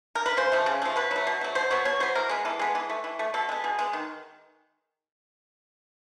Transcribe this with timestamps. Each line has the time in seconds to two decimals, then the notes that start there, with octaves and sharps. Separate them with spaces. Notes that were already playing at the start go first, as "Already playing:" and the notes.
0.15 A#4
0.26 B4
0.37 C#3 C5
0.52 F3 A3
0.66 C#3
0.82 F3 A3
0.96 B2 B4
1.11 F#3 A3
1.27 B2
1.41 F#3 A3
1.55 B2 C5
1.70 F#3 B3 C#5
1.85 B2 C#5
2.00 F#3 B3 C5
2.15 E3 A#4
2.29 G#3 B3
2.45 E3 A4
2.59 G#3 B3
2.75 E3
2.90 A3
3.04 E3
3.19 A3
3.34 B2 A4
3.49 G#3 B3
3.64 B2 G#4
3.79 G#3 B3
3.93 D#3